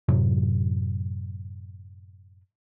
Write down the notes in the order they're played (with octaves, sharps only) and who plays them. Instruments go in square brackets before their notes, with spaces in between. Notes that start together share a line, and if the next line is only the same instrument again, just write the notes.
[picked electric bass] F#2 A2 C3 F#3